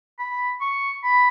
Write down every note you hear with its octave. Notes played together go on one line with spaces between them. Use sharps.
B5
C#6
B5